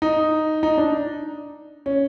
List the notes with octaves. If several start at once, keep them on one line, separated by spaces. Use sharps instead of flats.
D#4
D#4
D4
C#4